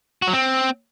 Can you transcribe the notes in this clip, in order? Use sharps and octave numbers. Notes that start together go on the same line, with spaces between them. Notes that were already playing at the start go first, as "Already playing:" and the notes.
F#4
F#3
C4